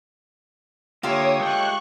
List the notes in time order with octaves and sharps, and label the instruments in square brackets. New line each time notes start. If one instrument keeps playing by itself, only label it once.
[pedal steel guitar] D3 A#3 [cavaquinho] F4 G4 E5 [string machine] C#5 D#6
[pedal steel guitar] G#3 A4 G5 [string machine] C#6 F#6